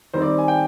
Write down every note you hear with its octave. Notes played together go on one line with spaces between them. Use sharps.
D#3 G3 C4 C5
D5
G#5
G5